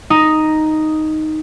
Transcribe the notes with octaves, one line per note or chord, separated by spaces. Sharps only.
D#4